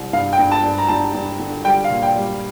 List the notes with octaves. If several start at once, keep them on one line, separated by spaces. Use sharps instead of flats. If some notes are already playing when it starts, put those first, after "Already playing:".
Already playing: C2
G2 F5
G5
G2
A5
G2
A#5
G2 A5
G2
D3
G3 G5
F5
A#2
G5
G3